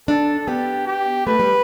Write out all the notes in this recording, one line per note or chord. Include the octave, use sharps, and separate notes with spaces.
D4 A4
B3 G4
G4
A3 B4
G3